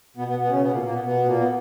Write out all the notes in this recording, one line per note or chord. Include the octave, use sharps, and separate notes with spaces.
B2 B3
B2 B3
B2 B3
C#3 C#4
B2 B3
A#2 A#3
A#2 A#3
B2 B3
B2 B3
A#2 A#3
B3